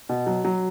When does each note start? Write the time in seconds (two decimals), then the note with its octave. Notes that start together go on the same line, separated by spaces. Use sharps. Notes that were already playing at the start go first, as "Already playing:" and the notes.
0.09 B2
0.27 F#3
0.45 F#3